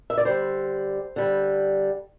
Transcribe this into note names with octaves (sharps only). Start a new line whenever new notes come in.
E5
D5
D3 G3 C5
D3 G3